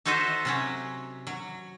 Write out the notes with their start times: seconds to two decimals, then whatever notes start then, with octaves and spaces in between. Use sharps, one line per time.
0.05 D#4 F#4 A4 C5 D#5 E5
0.45 C3 F#3 C#4
1.27 F#3